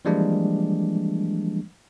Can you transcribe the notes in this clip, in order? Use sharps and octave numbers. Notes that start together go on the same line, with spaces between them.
E3 F3 G3 G#3 A#3 D4